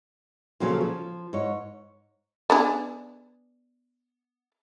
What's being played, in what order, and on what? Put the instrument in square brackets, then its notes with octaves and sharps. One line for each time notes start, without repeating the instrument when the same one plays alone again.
[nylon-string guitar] A#2 C#3 F3 F#3 C#4 A4
F3
G#2 C#5
[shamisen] B3 D4 G#4